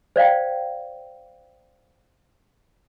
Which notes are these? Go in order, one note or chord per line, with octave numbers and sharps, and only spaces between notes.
C5 D5 F5 G5